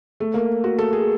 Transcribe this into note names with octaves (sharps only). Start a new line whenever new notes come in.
A3
A#3
F#4
A4
G#4